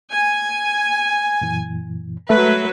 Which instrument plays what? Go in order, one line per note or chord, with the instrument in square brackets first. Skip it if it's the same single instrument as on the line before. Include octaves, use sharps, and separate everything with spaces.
[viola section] G#5
[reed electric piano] F#2 A#2 E3
[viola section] F#3 B4 [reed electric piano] G#3 A3 E5